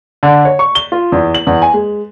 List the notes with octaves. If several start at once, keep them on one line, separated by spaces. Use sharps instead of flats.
D3
C#5
C#6
G7
F4
E2
F#7
E2
G#5
G#3